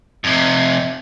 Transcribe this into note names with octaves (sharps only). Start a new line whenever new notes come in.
F2 C3